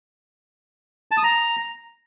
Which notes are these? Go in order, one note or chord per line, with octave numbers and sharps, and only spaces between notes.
A5
D#6
A#5